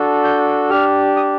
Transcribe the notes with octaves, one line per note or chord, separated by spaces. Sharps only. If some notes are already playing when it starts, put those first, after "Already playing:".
Already playing: D4 F#4 A4
G6
D4 G4 F6
D#6